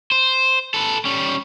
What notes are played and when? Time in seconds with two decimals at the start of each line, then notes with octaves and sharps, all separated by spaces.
0.12 C5
0.74 A4 B4
1.05 G3 C#4